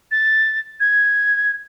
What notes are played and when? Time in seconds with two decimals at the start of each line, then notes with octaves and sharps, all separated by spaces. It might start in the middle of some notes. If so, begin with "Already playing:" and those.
0.11 A6
0.80 G#6